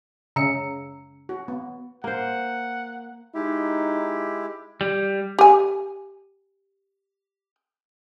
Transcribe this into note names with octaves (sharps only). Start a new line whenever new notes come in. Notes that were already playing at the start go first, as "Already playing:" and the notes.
C#3 A#5 E6 C#7
F#4
B3
A#3 C5 F#5
G#3 D#4 E4 G4
G3
G4 G#5